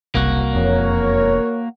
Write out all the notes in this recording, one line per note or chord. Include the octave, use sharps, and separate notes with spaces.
F#1 C2 A#3 F#4
E1 F2 A#4 C#5